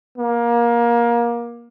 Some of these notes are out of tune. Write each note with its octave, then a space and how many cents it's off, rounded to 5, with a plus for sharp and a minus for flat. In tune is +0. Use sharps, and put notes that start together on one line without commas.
A#3 +25